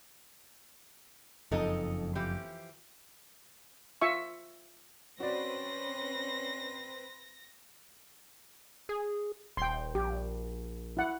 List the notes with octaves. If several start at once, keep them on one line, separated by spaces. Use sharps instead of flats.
F#1 F2 D#4 A4 D#5
E3 F3 G4
F4 E5 C#6
C4 C#4 F#4 B4 C5 D5 A#6
G#4
D#1 G5 C6
A#1 G4
E4 F#5